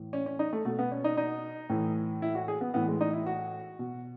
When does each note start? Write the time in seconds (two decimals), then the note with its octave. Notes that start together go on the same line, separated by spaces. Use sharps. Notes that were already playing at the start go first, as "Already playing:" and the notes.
Already playing: A2 E3
0.13 C#4
0.26 C#4
0.39 D#4
0.53 A3
0.65 B2 A3
0.79 B3
0.92 C#4
1.04 D#4
1.17 D#4
1.70 A2 E3
2.22 E4
2.35 F#4
2.48 G#4
2.61 B3
2.74 A2 E3 B3
2.88 G#3
3.01 D#4
3.13 E4
3.26 F#4
3.79 B2